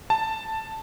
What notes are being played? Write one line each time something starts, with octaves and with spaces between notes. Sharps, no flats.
A5